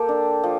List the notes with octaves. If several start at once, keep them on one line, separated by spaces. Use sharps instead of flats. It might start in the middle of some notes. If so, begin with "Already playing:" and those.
Already playing: A#3 G4 A4
D4
F3